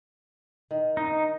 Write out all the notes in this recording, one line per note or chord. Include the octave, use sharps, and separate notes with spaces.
D#3
D#4